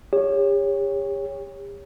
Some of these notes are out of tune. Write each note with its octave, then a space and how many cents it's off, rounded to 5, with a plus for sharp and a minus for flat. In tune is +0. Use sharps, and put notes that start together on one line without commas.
G4 +40 C#5 +0